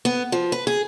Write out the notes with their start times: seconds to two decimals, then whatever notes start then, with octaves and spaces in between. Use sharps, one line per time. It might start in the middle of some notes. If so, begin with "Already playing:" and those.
0.05 B3
0.32 F3
0.52 B4
0.67 G#4